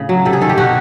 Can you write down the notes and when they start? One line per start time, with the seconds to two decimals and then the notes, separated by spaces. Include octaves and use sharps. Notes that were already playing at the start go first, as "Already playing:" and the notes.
Already playing: A2 C#3
0.09 F#3
0.25 C3 A4
0.33 G#4
0.41 D#3 A4
0.49 G4
0.57 B2 F#4